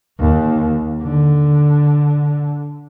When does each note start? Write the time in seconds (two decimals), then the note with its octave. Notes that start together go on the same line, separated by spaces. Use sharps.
0.20 D#2
1.02 D3